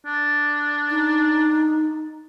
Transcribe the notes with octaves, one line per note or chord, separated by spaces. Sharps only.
D4
D#4